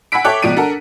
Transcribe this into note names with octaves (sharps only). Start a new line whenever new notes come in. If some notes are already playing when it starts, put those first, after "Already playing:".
F#5 G#5 B5 E6 B6 D7
A4 C#5 E5 G5 D6 F#6
C#2 B2 F3 D5 D7 D#7
D4 A4 A#4 F#5